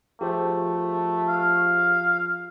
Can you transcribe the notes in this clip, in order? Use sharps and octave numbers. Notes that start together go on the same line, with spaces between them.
F3 A3 G4 G#4 C5
F5